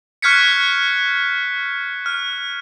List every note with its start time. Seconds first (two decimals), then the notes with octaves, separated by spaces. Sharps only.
0.22 C#6 F6 F#6 G#6 B6 C#7
2.06 F6